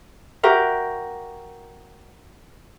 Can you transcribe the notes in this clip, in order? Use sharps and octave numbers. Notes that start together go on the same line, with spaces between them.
F#4 G4 A#4 E5